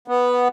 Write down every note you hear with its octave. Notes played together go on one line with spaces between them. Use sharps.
B3